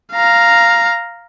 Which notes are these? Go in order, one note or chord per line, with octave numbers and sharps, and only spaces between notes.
F5 A#5